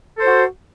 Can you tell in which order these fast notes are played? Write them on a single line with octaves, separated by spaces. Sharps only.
A4 C5 F#4